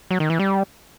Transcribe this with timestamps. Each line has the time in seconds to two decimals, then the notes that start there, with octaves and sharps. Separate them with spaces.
0.11 F#3
0.20 D#3
0.30 E3
0.39 G3